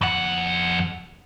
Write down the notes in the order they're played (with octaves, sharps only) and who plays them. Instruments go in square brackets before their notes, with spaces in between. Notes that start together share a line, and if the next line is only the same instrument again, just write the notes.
[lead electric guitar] F2 F#5